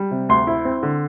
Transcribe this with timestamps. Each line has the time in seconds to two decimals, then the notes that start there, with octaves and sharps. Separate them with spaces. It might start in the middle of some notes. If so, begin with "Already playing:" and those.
Already playing: G3
0.11 C3
0.29 D2 C6
0.47 E4
0.65 C4
0.83 D3